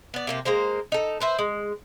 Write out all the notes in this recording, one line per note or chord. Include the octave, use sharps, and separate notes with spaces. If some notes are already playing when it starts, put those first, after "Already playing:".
B3 D5
C3 A#3 G4
G#3 A#3 C5 A#5
D#4 A4
B4 C5 E5
G#3